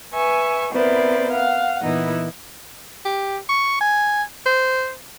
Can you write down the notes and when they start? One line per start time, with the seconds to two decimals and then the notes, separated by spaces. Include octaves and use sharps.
0.13 B4 E5 G#5 C#6
0.74 B3 C4 E4 A#4 C5 D5
1.31 F5 F#5
1.81 A#2 E3 B3 D#4 E4
3.05 G4
3.49 C#6
3.81 G#5
4.46 C5